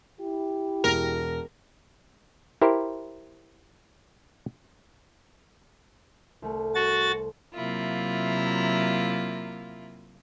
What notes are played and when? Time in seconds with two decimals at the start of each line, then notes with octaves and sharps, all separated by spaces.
0.20 E4 G4
0.84 E1 A#4
2.62 E4 G4 A#4 C5
6.42 C2 A3
6.75 F#4 A6
7.54 C3 F#3 A#3 E4 F4